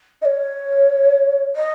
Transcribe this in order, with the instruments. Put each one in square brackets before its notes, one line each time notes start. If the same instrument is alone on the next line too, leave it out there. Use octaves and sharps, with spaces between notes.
[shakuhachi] D#5
C#5
D#5